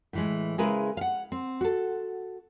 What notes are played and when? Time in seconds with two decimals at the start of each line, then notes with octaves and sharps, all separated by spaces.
0.13 A2 E3 G#3
0.58 C#3 G#3 E4 G#4 A#4 B4
0.97 F5 F#5
1.32 C4
1.61 F#4 A4